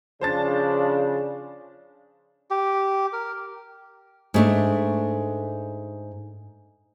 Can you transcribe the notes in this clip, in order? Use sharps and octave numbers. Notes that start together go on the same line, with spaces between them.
C#3 F3 D4 C5 A5 A6
G4
A#4
G#2 A3 D4